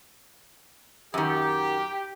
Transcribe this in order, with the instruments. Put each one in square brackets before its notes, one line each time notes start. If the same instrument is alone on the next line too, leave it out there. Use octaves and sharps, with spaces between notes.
[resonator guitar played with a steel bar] F#2 D#3 [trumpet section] G4